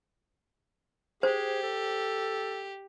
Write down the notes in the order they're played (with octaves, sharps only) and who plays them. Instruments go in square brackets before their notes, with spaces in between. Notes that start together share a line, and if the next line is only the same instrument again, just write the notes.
[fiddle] G4 [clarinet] G#4 [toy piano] C5
[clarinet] A4